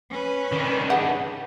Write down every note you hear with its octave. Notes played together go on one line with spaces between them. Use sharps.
C#4 B4
D#3 D4
G3 G#4 F#5